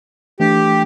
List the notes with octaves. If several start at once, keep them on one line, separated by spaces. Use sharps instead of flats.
E3 A3 D4 G4